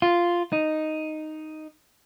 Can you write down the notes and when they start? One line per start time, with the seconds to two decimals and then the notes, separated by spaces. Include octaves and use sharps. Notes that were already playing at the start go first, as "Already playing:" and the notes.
0.02 F4
0.53 D#4